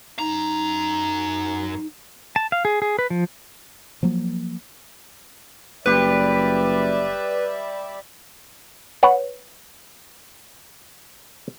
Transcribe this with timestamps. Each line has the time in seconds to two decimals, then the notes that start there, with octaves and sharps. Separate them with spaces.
0.19 F#2 D#4 A#5
2.36 A5
2.52 F5
2.65 G#4
2.82 G#4
2.99 B4
3.10 F3
4.03 F3 F#3 A#3
5.86 F#1 G3 G4 B4 D5 E5
9.03 B4 C#5 F#5